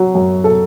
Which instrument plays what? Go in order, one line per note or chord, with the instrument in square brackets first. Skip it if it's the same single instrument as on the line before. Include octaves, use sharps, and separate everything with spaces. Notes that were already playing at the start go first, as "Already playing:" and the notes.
Already playing: [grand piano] F#3
F#2
A4